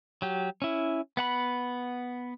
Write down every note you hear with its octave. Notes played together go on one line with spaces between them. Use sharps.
F#3 G4
C#4 E4
B3 F#5 B5